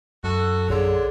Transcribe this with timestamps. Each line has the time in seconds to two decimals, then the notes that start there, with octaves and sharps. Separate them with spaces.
0.24 F#2 F#4 A4
0.69 A#1 D3 G#4 C#5 C6